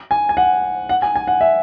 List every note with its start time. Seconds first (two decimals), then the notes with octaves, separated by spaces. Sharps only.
0.11 G#5
0.29 G#5
0.37 F#5
0.89 F#5
1.02 G#5
1.16 G#5
1.27 F#5
1.41 E5